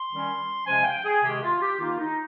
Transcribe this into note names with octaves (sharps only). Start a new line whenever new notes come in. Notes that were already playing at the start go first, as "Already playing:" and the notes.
Already playing: C6
D#3 G3 C#4
C3 F3 G#3 C#4 G#5
F5
G5
G#4
C3 D#3 G#3 G4
F4
G4
D#3 A#3 D#4 F4
D#4